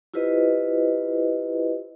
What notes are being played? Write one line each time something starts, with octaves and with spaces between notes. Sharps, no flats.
E4 F4 G4 B4 C5 D#5